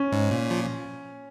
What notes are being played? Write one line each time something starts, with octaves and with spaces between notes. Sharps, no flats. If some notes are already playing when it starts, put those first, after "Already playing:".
Already playing: C#4
G#2
A#2
F3